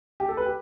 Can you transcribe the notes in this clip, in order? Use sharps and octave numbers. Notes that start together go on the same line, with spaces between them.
G4
A4
B4
G4